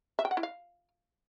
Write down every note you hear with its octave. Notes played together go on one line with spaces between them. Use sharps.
E5
G5
F#5
E4
F5